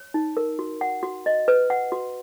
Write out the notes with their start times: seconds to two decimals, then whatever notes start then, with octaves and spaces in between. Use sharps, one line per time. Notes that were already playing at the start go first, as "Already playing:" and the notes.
Already playing: C#5
0.14 D#4
0.37 A#4
0.59 F#4
0.81 F#5
1.03 F#4
1.26 D#5
1.48 B4
1.70 F#5
1.92 F#4